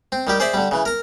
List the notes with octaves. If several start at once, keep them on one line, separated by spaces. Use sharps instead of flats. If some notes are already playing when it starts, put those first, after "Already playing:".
C4
D#3 G3 G4
G#4 C5 D5 E5
D3 G3
C#3 E3
A#4 A#5